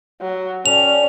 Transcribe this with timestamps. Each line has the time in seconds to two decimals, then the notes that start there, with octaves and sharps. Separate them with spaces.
0.21 F#3
0.66 C#4 A4 D5 G5 F7